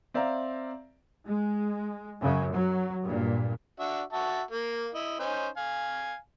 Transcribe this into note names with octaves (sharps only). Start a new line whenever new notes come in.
C4 D5 E5 F5 A#5
G#3
F#2 C#3
F#3
G2 A#2
D4 F#4 E5
F#4 E5 A5
A#3
E4 D#5
C#4 D#4 C5
F5 G#5